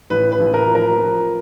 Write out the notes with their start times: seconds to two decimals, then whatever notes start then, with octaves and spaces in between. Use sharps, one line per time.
0.10 A1 B4
0.32 B4
0.39 A1
0.54 A#4
0.68 F3
0.75 A#4
0.97 F3